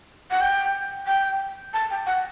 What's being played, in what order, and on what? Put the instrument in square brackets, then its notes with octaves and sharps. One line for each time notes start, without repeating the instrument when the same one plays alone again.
[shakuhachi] F#5
G5
G5
A5
G5
F#5